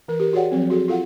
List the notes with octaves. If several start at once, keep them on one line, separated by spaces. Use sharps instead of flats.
E3 A#4
G4 A#4
F#4 G#4 C#5 D5 F#5 G5
F3 F#3 C4
F#4 G#4 A4
F4 A4 F5 F#5